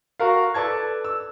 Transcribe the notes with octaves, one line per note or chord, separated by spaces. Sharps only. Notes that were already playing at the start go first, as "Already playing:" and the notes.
F#4 A#4 F5
A4 B4 D5 A5 G#6
E6